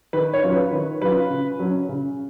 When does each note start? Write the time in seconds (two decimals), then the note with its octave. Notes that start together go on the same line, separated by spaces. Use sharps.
0.13 D#3 B4
0.33 C#5
0.43 F#3 C#4 F4
0.52 B4
0.72 D#3 B4
1.01 F#3 C#4 F4 B4
1.30 C#3
1.59 F#3 C#4
1.89 C#3